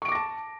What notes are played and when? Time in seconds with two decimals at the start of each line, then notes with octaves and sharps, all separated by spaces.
0.02 C#6
0.05 D7
0.08 D6
0.12 A#6
0.15 A5